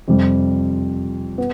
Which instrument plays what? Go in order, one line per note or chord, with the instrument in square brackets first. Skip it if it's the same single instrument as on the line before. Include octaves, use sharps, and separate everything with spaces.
[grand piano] F2 C3 G3
B3